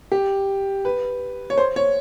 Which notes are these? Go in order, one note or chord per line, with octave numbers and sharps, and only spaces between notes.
G4
B4
C#5
C5
C#5